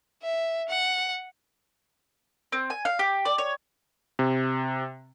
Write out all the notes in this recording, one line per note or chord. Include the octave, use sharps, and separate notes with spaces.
E5
F#5
C4
G#5
F5
G4
D5
C#5
C3